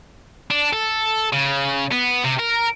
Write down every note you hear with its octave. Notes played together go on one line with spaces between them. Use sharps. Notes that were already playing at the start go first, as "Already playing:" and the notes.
D4
A4
C#3
B3
C3
A#4